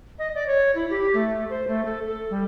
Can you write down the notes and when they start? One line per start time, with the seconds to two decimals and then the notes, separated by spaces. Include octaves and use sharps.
0.19 D#5
0.35 D5
0.47 C#5
0.75 E4
0.90 G4
1.14 A3
1.50 C5
1.68 A3
1.85 A4
2.07 A4
2.30 G3